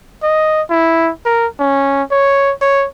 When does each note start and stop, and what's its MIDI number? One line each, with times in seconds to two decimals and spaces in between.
0.23 0.62 75
0.70 1.11 64
1.26 1.47 70
1.60 2.03 61
2.12 2.53 73
2.62 2.86 73